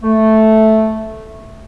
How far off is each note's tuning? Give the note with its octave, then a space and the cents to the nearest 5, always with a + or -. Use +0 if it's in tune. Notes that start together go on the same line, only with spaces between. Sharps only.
A3 -5